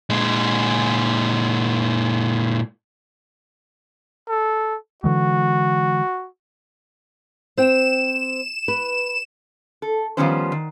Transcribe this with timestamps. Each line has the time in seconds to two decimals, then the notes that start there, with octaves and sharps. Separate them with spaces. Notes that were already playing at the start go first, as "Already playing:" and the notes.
0.10 A#2 G#3
4.28 A4
5.04 D3 E3 G#3 F#4
7.57 C4 G5 E7
8.68 B4
9.82 A4
10.17 D#3 F3 G3 B3 C#4 C5
10.52 D#3